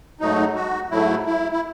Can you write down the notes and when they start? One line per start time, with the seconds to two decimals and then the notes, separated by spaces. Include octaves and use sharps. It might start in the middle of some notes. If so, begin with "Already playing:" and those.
0.20 G#2 F#3 A3 D#4
0.55 F#4
0.91 G#2 F#3 A3 E4
1.26 E4
1.52 E4